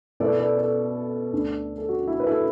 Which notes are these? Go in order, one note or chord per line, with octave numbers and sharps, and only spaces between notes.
B2 B3 E4 A4 D5
A4 D5
A4 D5
D2 D3 A3 D4
A4
F#4
E4
B4
E4 A4